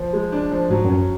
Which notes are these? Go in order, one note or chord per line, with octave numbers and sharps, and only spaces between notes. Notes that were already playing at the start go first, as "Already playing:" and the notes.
Already playing: F3
G#3
D4
F3
G#2 F#3
F#2
C#4